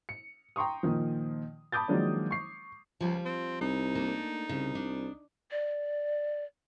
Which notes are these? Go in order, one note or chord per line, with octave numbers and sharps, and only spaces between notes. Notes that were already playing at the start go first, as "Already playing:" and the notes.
C#7
G5 A#5 C6 C#6 D#6
A#2 D#3 F3
A5 B5 D6 D#6 G6 A6
D#3 F3 F#3 G#3 A#3 D4
C#6 C7
C#2 F3 G3 F4
C4
C2 D#4
A3 A#3 D4
C2 C#3
D4
D5